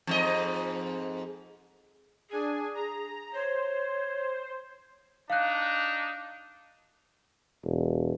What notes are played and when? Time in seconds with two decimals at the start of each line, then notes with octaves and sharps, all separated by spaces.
0.07 F2 G#2 D#5
2.31 D4 G#4 G#5
2.74 A#5
3.33 C5 C#5
5.30 D4 D#4 F5 F#6
7.65 E1